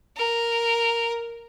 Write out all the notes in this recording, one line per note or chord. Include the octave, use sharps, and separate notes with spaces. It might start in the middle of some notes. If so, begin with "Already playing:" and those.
A#4